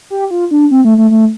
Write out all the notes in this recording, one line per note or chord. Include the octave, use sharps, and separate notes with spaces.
G4
F4
D4
C4
A3
A3
A3